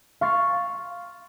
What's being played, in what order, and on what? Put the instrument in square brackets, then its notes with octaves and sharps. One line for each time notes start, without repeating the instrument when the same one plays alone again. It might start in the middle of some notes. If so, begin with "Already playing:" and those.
[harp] F5 C6 C#6 A6 C7 C#7